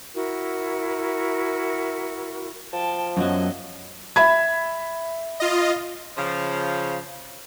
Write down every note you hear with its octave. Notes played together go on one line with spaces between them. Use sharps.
E4 F#4 A#4
F3 G5 A5
F#2 F#3 B3 D#5
E5 B5 G#6
F4 D#5
C#3 F3